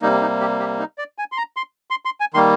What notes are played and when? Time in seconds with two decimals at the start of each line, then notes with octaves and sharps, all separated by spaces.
0.02 C3 G3 A#3 D#4
0.21 D#4
0.40 G4
0.60 G4
0.79 D#4
0.98 D5
1.18 G#5
1.32 C6
1.37 A#5
1.57 C6
1.90 C6
2.05 C6
2.20 G#5
2.34 D#3 G3 A#3 C6